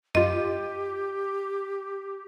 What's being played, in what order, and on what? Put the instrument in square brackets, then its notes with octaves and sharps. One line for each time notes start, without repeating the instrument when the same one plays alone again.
[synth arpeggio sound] F#2 F4 [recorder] G4 [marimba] D#5